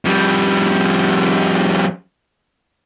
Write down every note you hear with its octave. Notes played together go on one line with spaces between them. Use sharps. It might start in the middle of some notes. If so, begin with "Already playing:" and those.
F2 G3